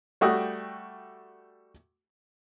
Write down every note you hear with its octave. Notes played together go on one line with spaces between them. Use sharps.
G3 A3 F#4 G5 D#6